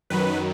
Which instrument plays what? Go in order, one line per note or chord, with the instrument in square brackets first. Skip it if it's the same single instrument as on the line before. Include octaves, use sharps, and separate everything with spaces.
[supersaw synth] F#2 D#3 F#3 B4